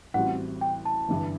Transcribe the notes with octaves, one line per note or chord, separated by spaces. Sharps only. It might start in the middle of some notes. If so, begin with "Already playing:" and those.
A1 A2 G3 C4 F#4 F#5
G5
A5
G1 G2 E3 G3